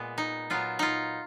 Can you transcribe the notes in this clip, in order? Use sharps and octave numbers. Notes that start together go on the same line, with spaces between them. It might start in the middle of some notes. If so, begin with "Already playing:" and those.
Already playing: A#2 G#3 B3
D#4
A#2 F#3 B3 F4
D#4 F4